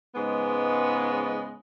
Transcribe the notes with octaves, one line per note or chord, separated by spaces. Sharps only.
G#2 C#3 G#3 B3